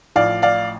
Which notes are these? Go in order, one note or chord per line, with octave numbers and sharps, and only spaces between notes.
A1 A2 F3 D5 F5
D5 F5